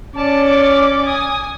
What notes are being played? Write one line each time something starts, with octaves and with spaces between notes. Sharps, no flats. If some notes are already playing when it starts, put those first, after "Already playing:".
C#4 D5 A5
D6
G#5 D#6